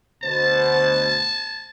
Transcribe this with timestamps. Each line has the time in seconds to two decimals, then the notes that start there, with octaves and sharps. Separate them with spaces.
0.23 D2 B2 C5 A5